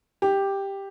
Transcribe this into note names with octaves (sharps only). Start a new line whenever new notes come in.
G4